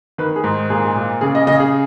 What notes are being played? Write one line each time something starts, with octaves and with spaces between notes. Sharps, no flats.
D#3 B4
G#4
G#2
A#2 G#4
A#2
C#3 G#4
D#5
C#3 D#5
G#4